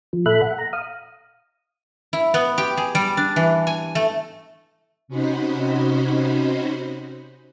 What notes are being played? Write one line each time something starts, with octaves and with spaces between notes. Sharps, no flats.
F3
A#2 A4 E5 B5 F#6
F#5
A#5
F5 D#6
E4
B3
G4
G#4
G3
D4
E3
G#5
A3
C3 C#4 D#4 F#4 C5 B5